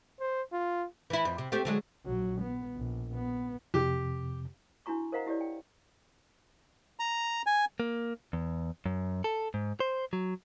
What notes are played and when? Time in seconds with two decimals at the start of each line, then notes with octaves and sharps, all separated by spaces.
0.20 C5
0.52 F4
1.10 E3 E4
1.25 F2
1.38 C3
1.52 A3 C4 G4
1.65 D3 F#3 G#3
2.06 A#1 F#3
2.41 B3
2.76 A#1
3.13 B3
3.74 F2 C3 G4
4.86 D4 E4 F#4 A#5 C#6
5.12 A#4 C5 D#5 F5 F#5 A#5
5.26 E4 G4 C#5 D5
5.41 G5
7.00 A#5
7.46 G#5
7.80 A#3
8.33 E2
8.86 F#2
9.24 A4
9.54 G#2
9.80 C5
10.13 F#3